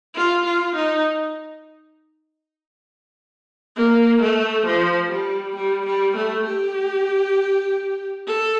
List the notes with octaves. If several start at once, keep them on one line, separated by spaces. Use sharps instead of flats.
F4
F4
D#4
A#3
A3
F3
G3
G3
G3
A3
G4
A4